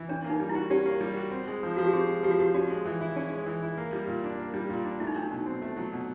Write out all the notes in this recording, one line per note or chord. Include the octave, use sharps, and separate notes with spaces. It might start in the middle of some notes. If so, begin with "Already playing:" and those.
Already playing: E3
C#4 D4
A#3
D#4
G3
E4
F#4
C#4 G4
A#3
G3
F#4
C4
G#3
F3
F3 F#4
G4
C4 G#4
G#3
F3 G4
F#4
F3 G4
C#4 F#4
G#3
E3
E4
C#4
G#3
E3
E4
A#3
G3
A#2
D4
A#3
G3
A#2
D4
A3 E4
D#4
F#3 D4
D#4
B2
C4
A3
F#3
B2